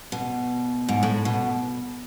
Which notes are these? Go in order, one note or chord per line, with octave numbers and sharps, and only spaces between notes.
B2
G#2
A2
B2